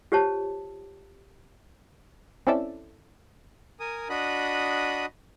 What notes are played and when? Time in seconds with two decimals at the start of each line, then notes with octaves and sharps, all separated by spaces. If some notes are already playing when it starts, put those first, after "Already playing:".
0.12 F4 G4 C5 C#5 A5
2.47 C4 C#4 E4 A4 D5 E5
3.80 A#4 G#5 D#6
4.10 D4 F#4 D#5 B5 D#6 F#6